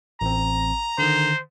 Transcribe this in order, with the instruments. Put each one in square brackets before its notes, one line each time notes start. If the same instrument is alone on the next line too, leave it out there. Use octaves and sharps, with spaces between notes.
[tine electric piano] A1 C4 [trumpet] A#5
[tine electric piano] D3 D#3 [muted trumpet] C5